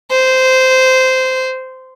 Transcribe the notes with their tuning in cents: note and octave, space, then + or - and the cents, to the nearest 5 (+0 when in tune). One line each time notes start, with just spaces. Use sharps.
C5 -15